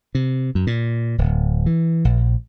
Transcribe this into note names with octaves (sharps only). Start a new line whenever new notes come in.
C3
F#2
A#2
D1
E3
A#1